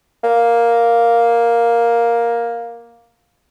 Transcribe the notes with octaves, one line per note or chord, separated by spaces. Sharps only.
A#3